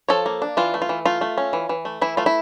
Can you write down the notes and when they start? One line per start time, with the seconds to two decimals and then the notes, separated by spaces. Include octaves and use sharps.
0.09 F3 A4 C#5
0.26 A#3
0.42 D4
0.57 E3 F4
0.74 A3
0.82 F4
0.89 E3
1.05 A3 F4
1.21 A3
1.38 C#4
1.53 E3
1.69 E3
1.85 A3
2.01 E3 E4
2.17 A3 F4
2.26 E4